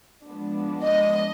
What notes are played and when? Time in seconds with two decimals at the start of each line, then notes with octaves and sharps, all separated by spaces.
0.25 F3 G#3 B3 D4
0.84 D#5